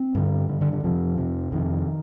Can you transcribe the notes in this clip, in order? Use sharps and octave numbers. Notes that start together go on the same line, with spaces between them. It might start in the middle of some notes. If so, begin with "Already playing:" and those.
Already playing: C4
G2 D3
G2 D3
D3
D3
F2 C3 F3
F2 C3
F2 C3 D#3